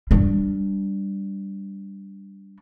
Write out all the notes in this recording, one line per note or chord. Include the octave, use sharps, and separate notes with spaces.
G3 D4